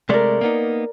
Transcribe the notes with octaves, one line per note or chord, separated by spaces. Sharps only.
C3 G#3 A3 A#4 D5
A#3 B3 D#4